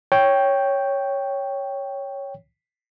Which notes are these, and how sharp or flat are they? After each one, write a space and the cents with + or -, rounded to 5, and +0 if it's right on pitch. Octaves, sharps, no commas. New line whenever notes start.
C#5 +0 G5 +0